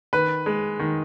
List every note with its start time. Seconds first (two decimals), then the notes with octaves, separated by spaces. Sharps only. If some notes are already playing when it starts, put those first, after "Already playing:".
0.13 D#3 B4
0.46 G#3
0.79 D#3